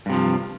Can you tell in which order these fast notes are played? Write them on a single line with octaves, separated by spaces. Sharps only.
G2 C3 F3